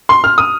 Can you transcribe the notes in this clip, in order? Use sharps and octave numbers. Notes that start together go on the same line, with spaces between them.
C6
F6
D#6